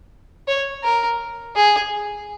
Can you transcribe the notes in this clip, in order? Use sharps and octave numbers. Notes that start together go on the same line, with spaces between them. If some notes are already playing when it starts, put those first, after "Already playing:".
C#5
A#4
G#4